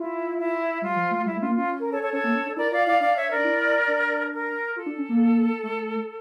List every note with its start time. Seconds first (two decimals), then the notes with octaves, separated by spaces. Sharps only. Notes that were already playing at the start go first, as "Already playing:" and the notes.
Already playing: E4 F4
0.38 E4
0.82 G3 F4
0.96 F3
1.11 A3
1.25 G3 E4
1.36 A3
1.41 C#4 F4
1.47 A#3
1.54 C#4 F4
1.80 A#4
1.91 A4 C#5
2.02 A4 C#5
2.12 C#4 A4 C#5
2.24 A#3
2.35 C#4
2.46 D4
2.57 E4 A#4 D5
2.71 F4 D5 F5
2.86 E4 D5 F5
3.00 D4 D5 F5
3.15 C#5 E5
3.30 A#4 D5
3.37 D4
3.45 E4
3.88 D4
4.32 A#4
4.76 F4 A4
4.86 D4
4.97 C#4
5.09 A#3
5.63 A3